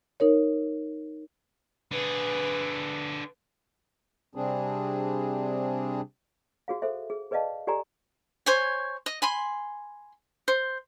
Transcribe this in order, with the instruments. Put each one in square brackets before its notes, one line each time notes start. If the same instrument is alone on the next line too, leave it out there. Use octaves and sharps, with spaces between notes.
[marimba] D#4 A#4 C#5
[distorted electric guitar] D3 G#4 [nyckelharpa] B4
[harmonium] C3 G3 C4 D4 G#4
[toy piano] F#4 G#4 F5
A4 C5 E5
G#4
G#4 B4 D5 D#5 F5 A5
G4 A4 D5 G#5 A#5
[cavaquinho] C5 C#5 G#5
D#5
G#5 B5 C6
C5